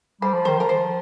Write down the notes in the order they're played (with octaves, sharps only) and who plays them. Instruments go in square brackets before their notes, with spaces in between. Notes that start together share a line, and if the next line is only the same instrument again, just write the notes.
[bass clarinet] G3 [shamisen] C5
[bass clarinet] F3
[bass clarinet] D#3 [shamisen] C5
[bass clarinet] F3 [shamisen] A#4
[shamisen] C5